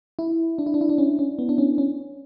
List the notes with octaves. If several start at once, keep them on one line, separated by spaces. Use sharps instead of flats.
E4
D4
E4
D4
E4
D4
C#4
C#4
B3
D4
C#4
C#4